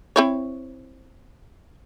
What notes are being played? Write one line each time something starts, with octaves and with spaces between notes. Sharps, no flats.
C4 E4 C#5